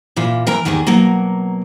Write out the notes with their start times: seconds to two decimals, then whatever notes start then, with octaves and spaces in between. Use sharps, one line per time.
0.16 A#2 E3 F4
0.47 E3 A#4 G5 A#5
0.65 E2 D#3 A#3 G4 G#4
0.87 B2 F#3 A#3